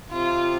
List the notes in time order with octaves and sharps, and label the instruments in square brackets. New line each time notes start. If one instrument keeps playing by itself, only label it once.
[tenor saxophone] C3 [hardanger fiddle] F4